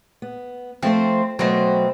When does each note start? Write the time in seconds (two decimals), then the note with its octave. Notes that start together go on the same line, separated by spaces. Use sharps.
0.22 B3
0.83 F3 A3 C4 C5
1.39 B2 F#3 A3 C4